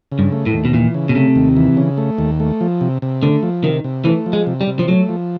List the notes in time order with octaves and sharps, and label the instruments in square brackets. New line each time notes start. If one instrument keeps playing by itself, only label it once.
[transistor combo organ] C#3
[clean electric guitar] G2
[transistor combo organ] A3
[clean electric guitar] A2
[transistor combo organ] D#2
[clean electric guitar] B2
[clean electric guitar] A#2 [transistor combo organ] E3
[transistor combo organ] C#3
[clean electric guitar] B2
[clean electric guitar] C3 [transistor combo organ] A3
[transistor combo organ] D#2
E3
C#3
A3
D#2
A3
F3
C3
C3
[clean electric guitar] D3 [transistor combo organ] A3
[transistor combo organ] F3
[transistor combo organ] C3 [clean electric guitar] D#3
[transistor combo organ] C3
[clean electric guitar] E3 [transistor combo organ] A3
[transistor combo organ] F3
[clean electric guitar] G#3
[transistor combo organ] C3
[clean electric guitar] G3
[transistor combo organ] C3
[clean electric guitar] F3
[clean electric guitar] F#3 [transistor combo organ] A3
[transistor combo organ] F3